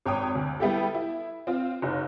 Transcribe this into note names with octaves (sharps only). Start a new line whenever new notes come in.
G#1 C#5 G5 D#6
D2
G3 B3 E4 G4 A4
E4
C4 F4
F#1 D#4